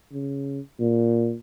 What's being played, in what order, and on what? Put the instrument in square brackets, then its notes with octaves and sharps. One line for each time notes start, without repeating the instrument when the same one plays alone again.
[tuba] C#3
A#2